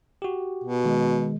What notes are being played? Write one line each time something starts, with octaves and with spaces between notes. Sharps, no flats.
F#4 G4
B2
D#3 G#3